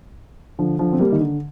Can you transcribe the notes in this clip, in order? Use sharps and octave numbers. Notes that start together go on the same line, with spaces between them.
D3 F3
D3 F3
C4
G3 A#3
D#3
D3